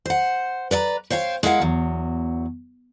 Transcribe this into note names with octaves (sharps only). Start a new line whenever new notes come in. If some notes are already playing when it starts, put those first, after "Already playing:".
C5 F#5
B4 D5 D#5 A#5
C5 C#5 F5 G5
G#3 E4 A#4 F5 F#5
E2 F#3